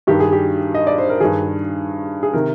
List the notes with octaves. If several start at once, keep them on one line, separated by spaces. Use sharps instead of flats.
G2 D#3 G4
G#4
G4
D#5
D5
C5
A#4
G2 D#3 G#4
G#4
C3 D#3 A#4